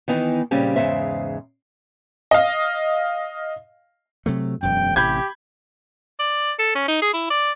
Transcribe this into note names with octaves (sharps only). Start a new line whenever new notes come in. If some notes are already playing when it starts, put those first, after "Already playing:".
D#3 E3 B3 D#4
A#2 C#3 G3 C4 C#4
E2 G#2 C#3 C5 E5
D#5 F5
C3 F#3 A3
E1 F#2 G5
A1 C3 G4 B5 G6 G#6
D5
A4
C#4
D#4
G#4
E4
D5